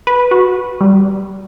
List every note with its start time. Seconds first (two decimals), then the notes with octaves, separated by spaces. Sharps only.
0.07 B4
0.31 F#4
0.81 G3